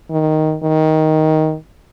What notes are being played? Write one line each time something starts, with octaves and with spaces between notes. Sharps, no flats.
D#3
D#3